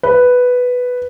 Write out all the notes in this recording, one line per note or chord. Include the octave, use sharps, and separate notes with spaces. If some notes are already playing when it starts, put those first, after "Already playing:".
B4